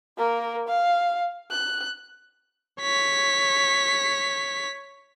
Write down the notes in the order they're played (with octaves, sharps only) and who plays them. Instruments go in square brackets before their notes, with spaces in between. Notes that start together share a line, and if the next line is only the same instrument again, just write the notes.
[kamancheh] A#3 A#4
F5
F#6
[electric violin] C#5 B6